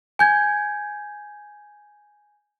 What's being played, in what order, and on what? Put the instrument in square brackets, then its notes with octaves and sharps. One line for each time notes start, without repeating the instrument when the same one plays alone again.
[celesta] G#5 G6 G#6